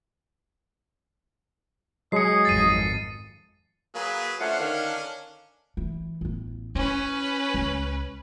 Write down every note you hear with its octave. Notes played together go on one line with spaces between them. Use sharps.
F#3 G#3 G#4 D#5 C7 C#7
G#1 F2 A6 C7 D#7
F#3 A#3 G#4 B4
A3 C#4 D4 F4 C5 F#5
D3 D#3 A#4 F5
E3
A1 B3
C#4 E4 B4
C#2